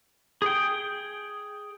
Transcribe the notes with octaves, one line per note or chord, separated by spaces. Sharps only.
G#4 G5